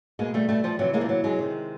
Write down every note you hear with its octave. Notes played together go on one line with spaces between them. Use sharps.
B2 G#3 A#3
G3 A3
G3 A3
F3 G3
C3 E3 F#3
G#3 A#3
F3
F#3
F#3 G#3
C3 D#3